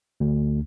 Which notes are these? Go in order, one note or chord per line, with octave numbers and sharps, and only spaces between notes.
D2